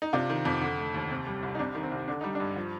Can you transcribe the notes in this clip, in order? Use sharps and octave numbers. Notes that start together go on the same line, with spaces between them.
D#4
C3 D4 F4
D#3
F2
D3
A3
D#2
C3
G3
C2
D#4
C3 D4
D#3
C4
C2
D3 D4
G3 D#4
G2 D4
F3